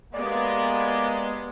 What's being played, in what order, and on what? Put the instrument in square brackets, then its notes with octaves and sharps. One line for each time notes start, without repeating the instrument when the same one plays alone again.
[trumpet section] G#3 [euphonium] A#3 [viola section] B3 G4 [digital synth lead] D5